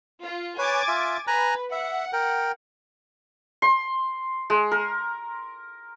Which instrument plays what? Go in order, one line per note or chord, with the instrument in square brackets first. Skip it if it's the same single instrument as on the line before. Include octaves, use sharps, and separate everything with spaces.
[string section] F4
[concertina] B4 C#5 [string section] G#5 D6 A6
[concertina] F4 E5
[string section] B4 [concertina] G#5 A#5 F#6
[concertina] E5 [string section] F#5
[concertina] A#4 G5
[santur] C6
G#3
A#4